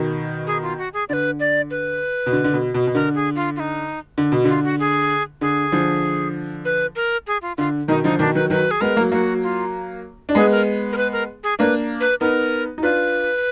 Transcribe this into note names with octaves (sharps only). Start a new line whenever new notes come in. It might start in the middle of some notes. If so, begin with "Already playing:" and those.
Already playing: B2 D#3
G#4
F4
F#4
G#4
D3 B4 D5
D5
B4
B2
D3
D3
B2
B2
B2
D3 A#4
G#4
F4
F4
D#4
D3
B2
D3 F4
F#4
G#4
D3 G#4
D3 F3
B4
A#4
G#4
F4
D3 F4
B2 D#3 D#4
D3 F3 D#4
B2 D#3 D4
D#3 F#3 B4
D#3 F#3 B4
G#4
G#3 B3 A#4
F#3 A#3
F#3 A#3 F#4
F4
D4
G#3 B3 G#4
A#4
A#4
B4
A#4
G#4
A#3 D4 B4
B4
B3 D#4 A#4
D#4
D4 F4 B4